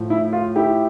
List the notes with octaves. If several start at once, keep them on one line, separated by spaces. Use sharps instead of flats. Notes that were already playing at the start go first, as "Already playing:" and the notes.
Already playing: A2 F3
E4
F4
E4 G4